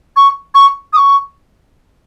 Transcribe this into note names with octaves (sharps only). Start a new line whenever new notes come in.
C#6
C#6
D#6
C#6